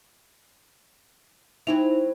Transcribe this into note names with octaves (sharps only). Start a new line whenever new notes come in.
F#3 C4 D#4 E4 F7